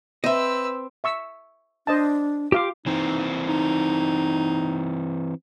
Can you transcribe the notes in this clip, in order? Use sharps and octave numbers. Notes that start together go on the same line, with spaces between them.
C4 B4 D#5 E5 E6
E5 C#6 E6
D4 C5 D#5 A5
F4 G4 F5 D6
E3 C4 D#4
D#4